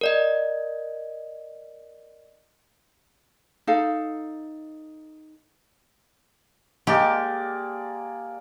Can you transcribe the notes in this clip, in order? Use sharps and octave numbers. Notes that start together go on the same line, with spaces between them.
A#4 D5 D#5
D#4 A4 F5
G#3 A#3 G4 D5